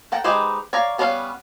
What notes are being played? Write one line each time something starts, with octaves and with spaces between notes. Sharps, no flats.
A4 F#5 G5 A#5
G#3 D#4 G4 B4 C5
C#5 D5 F5 A#5
G3 B3 C#4 D4 F5